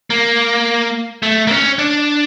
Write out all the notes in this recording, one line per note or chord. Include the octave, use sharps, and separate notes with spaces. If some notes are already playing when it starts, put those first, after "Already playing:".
A#3
A3
A#3
C#4
D4